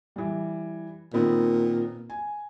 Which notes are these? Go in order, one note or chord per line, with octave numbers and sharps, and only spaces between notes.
E3 G3
A#2 D#3 B3 C4
G#5